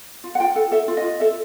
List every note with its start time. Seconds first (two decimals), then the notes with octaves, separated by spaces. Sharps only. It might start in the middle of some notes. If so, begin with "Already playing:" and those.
0.24 F4
0.35 F#5
0.40 F4 G5
0.56 A4 F#5
0.72 A4 E5
0.88 F4
0.97 D#5
1.04 F4
1.20 A4 E5